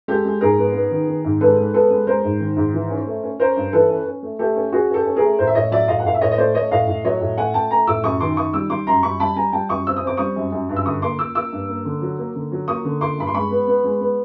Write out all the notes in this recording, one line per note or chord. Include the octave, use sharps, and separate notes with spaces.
G#3 G4 A4
G#3
G#2 G#4 A#4
B3
B3
D#3
D#3
G#2
G#3 A4 B4
G#3
B3 A4 B4
G#3
G#3 A#4 C5
G#2
D#3
G#2
E3
C#4
A3
C#4
C#4 A#4 C5
G2
E3 A4 B4
C#4
C#4
A3
A3 G4 A4
C#4
C#4 F#4 G#4
C#4 G4 A4
C#4
G#4 A#4
A3
A2 A#4 C5
E5
A2 C#5 D#5
F#3 D5 E5
A2 D#5 F5
F#5
A2 F5
E5
A2 C#5 D#5
D#5
A3 C5 D5
A3 C#5 D#5
A2 D#5 F5
A2
F#3 C#5 D#5
A2
A3 F#5 G#5
A3 G5 A5
A3 G#5 A#5
A2 D6 E6
F#2 C#6 D#6
D#3 C6 D6
D#3 C#6 D#6
G3 D6 E6
G3 C6 D6
F#2 A#5 C6
G3 B5 C#6
G3 A5 B5
G3 G#5 A#5
G3 G5 A5
F#2 C#6 D#6
C4 E6
D#6
C4 D6
G3 C#6 D#6
F#2
F#2
G2
E6
D3 C#6 D#6
A#3 C6 D6
A#3 D6 E6
A#3 D6 E6
G2
A#3
D3
F#3
A#3
D3
F#3
A#3 C#6 D#6
D3
A#3 C6 D6
G2 B5
C6
G#3 B5 C#6
B3
B3
G#3
B3